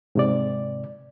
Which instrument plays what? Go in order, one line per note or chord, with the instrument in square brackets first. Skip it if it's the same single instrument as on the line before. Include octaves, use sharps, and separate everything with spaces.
[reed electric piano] G#2 C3 D5